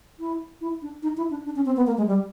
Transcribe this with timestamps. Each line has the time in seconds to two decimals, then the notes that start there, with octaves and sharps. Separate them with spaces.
0.20 E4
0.61 E4
0.82 D4
1.03 D#4
1.17 E4
1.30 D4
1.45 D4
1.56 C#4
1.66 C4
1.77 B3
1.87 A#3
1.97 G#3
2.07 G3